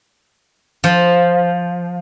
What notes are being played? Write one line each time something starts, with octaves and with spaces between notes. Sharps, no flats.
F3